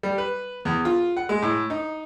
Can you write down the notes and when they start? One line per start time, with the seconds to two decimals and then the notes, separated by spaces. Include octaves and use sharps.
0.03 G3
0.18 B4
0.65 E2
0.85 F4
1.17 F#5
1.29 G#3
1.42 A2
1.70 D#4